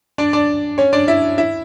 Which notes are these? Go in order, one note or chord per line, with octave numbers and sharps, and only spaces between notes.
D4 D5
D4 D5
C#4 C#5
D4 D5
E4 E5
E4 E5